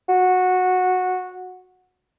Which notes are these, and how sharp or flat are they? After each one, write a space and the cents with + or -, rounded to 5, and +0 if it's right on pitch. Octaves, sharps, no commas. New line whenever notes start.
F#4 -10